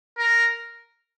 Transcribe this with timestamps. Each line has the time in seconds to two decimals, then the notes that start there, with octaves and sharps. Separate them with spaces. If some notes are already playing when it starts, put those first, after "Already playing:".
0.18 A#4